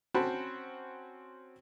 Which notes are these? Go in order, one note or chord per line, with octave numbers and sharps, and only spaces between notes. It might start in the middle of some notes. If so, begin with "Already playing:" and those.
C4 C#4 F#4 C5 A5 B5